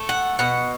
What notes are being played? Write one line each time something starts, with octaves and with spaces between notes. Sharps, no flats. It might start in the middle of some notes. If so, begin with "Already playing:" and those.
Already playing: A3
F#5
B2 F#5